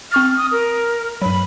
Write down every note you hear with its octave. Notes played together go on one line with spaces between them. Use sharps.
C4 C#6 F6 A6
D#6
A#4
G2 F#3 B5